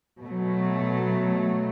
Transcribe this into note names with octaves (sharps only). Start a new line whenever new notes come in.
B2 F#3 A3